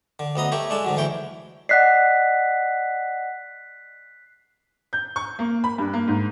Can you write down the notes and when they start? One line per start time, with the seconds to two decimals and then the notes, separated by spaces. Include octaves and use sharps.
0.19 D3
0.36 D2 B3 D#5 A#5
0.52 A3 G4 C#5
0.70 G#3 D4 A4
0.84 G#2 D3 F#3
0.96 D2 E3 C#5 G5
1.69 D5 D#5 F#5 F#6 B6 C7
4.93 G6
5.16 C#6
5.39 A#3
5.64 B5
5.78 G2
5.93 A#3
6.08 G#2